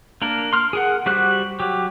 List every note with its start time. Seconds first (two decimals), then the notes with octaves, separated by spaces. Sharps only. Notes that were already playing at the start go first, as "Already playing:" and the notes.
0.22 A#3 D4 A#4
0.53 C6 F6
0.73 G#4 A#4 F#5
1.06 G3 F#4 G4 C5 F#6
1.60 F#3 G4